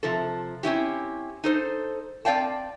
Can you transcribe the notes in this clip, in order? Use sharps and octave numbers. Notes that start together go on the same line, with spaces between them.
C3 F3 A4
C4 C#4 E4 G4
D#4 A4 C5
C4 D5 F5 G5 A5